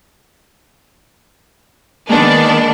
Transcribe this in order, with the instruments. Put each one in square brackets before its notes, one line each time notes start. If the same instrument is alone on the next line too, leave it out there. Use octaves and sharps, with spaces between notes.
[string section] D#3 B3 D4 [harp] G#3 A#3 D#4